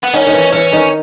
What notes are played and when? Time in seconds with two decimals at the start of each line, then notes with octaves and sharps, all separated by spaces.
0.04 B3
0.13 D#3 C#4
0.26 D#3
0.33 E3
0.53 E3 C#4
0.72 D#3